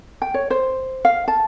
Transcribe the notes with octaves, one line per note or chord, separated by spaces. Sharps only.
G5
C#5
C5
F5
A5